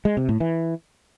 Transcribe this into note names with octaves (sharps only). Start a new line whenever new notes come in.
G#3
C3
A2
E3